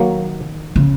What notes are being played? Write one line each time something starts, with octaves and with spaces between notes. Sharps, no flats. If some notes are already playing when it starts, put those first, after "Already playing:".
Already playing: D#3 F#3 A#3
C#3